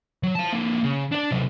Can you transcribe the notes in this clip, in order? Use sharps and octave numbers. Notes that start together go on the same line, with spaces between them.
F#3
F5 A5
D3 A#3
C#3
D4 D5
C3 F#3